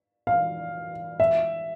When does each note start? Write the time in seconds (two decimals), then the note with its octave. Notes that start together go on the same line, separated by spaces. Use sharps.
0.27 F5
1.20 E5